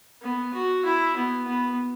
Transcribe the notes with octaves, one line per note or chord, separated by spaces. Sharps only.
B3
F#4
E4
B3
B3